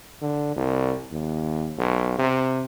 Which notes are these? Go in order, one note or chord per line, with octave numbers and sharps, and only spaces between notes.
D3
C2
D#2
B1
C3